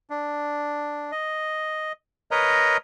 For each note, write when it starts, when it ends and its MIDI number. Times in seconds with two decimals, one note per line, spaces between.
0.10 1.12 62
1.12 1.92 75
2.31 2.77 70
2.31 2.77 71
2.31 2.77 73
2.31 2.77 75
2.31 2.77 82